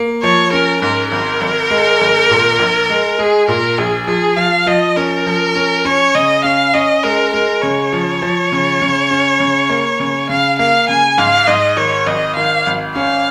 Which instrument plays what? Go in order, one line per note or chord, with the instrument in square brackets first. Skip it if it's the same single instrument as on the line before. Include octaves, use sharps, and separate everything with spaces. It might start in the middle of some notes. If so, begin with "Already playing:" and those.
Already playing: [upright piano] A#3
[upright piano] F3 [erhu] C#5
[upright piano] C#4 [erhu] A#4
[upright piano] G#2 [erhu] A#4
[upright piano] G#1 [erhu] A#4
[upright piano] G#1
G#3
G#1
A#2
A#1
G#3
[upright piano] G#3 [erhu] G#4
[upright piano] A#2 [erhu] A#4
[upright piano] A#1 [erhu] G#4
[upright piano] F3 [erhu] G#4
[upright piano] F3 [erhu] F5
[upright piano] F3 [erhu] D#5
[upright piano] C#4 [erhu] A#4
[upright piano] F3
C#4
[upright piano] C#4 [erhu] C#5
[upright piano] C#3 [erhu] D#5
[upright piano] C#4 [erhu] F5
[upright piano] C#4 [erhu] D#5
[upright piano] G#3 [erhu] A#4
[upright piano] G#3 [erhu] A#4
[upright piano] C#3 [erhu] C#5
[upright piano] F3
F3
C#3
C#3
C#4
C#3
A#3
C#3
[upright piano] C#3 [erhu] F5
[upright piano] A#3 [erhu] F5
[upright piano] C#3 [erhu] G#5
[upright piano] G#2 [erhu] F5
[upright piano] G#2 [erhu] D#5
[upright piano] D#3 [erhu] C#5
[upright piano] G#1 [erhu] D#5
[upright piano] D#3 [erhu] F5
[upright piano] G#1
[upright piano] C#4 [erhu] F5